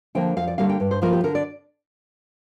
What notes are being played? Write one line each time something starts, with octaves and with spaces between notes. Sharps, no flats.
D3 F3 A#3 G5
F2 F5
D5
D3 G3 A#3 F5
G5
G2
C5
F3 A#3 F4 A#4
G4
D3 A#4
D5